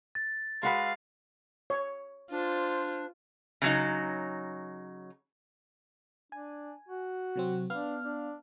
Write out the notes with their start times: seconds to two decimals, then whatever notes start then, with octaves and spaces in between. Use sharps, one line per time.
0.15 A6
0.63 G#3 F#4 B4 F5
1.70 C#5
2.31 D4 F4 C5
3.62 C#3 F#3 D#4
6.32 D4 G#5
6.89 F#4
7.36 C3 F#3 C4
7.70 B3 D4 F5 F6
8.04 D4